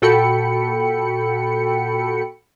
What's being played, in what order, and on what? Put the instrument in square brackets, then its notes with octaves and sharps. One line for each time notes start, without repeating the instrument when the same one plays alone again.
[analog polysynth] A#2 F#4 A4 G5 B5 C#7